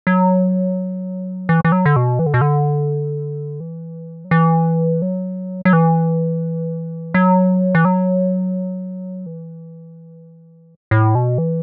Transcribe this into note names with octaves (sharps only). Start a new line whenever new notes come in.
F#3
E3
E3
F#3
D3
B2
E3
D3
B2
D3
E3
F#3
E3
F#3
F#3
E3
F#3
E3
F#3
E3
A2
B2
E3